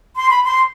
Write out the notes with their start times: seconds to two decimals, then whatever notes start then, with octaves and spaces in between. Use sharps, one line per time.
0.16 C6
0.30 B5
0.44 C6